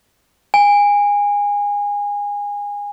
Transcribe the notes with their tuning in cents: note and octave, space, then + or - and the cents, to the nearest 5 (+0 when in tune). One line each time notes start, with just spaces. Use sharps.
G#5 -25